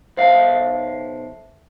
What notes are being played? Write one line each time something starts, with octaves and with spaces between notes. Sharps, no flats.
B1 C5 E5 F5 A5